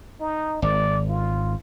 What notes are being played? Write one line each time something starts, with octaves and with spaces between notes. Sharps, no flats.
D#4
G#1 D5
F4